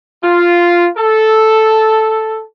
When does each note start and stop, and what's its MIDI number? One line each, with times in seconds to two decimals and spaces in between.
0.23 0.88 65
0.97 2.41 69